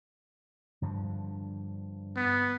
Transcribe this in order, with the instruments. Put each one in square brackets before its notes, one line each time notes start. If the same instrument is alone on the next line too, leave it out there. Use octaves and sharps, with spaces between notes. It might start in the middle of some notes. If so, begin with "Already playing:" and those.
[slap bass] G2 D3 F3
[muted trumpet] B3